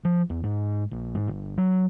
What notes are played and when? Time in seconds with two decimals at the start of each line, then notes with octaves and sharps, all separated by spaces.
0.05 F3
0.30 E2
0.44 G#2
0.91 A#1
1.15 G#2
1.28 G1
1.58 F#3